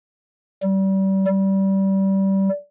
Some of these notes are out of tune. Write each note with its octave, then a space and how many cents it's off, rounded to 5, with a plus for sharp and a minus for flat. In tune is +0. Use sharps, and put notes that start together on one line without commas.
G3 -30
G3 -20